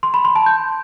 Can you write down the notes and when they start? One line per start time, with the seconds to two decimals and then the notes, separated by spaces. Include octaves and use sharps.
0.03 C6
0.14 B5
0.25 C6
0.35 A5
0.46 G6